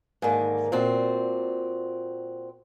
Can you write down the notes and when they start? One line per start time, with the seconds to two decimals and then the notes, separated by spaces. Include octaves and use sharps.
0.22 G#2 D3 D#3 A#3
0.72 A#2 C4 F#4